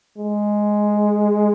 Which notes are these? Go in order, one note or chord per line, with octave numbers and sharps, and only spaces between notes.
G#3